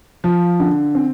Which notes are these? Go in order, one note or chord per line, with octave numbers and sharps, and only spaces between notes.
F3
D3
C4